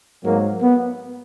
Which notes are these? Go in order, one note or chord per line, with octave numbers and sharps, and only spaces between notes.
G#2 F#3 A#3
B3